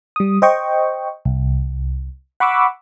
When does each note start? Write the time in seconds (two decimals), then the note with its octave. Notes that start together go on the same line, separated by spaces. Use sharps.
0.16 G3 D#6
0.42 C5 D#5 G5 C#6
1.25 C2
2.40 F#5 B5 C#6 D6 E6